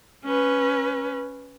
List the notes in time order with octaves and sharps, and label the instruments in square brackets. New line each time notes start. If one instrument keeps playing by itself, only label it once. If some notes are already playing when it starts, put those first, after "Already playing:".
[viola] C#4 B4